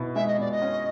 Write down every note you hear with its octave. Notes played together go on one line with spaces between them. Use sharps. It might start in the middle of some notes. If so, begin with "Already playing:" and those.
Already playing: B2 E4
G#3 E5
D#5
B2 D5
D#5
C#4